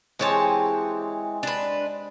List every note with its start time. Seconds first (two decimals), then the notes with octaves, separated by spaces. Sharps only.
0.19 E3 G#3 C4 G4 C#5 A5
1.43 D4 B4